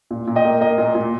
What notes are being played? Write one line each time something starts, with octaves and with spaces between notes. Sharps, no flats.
A#2
A#2
D#5 G5
A#3
A#3 D#5
A#2
A#2